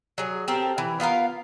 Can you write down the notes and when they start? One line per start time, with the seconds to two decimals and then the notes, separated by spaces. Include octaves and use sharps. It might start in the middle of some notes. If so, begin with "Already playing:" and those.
0.18 F#3 G#4
0.48 C4 G4 A4 A#4
0.78 E3
1.00 B3 F4 A#4 F5